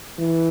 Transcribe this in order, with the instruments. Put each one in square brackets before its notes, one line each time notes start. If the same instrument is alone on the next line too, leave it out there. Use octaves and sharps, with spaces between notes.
[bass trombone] E3